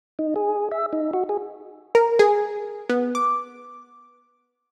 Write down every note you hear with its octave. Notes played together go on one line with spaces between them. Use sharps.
D#4
G#4
E5
D#4
F#4
G#4
A#4
G#4
B3
D6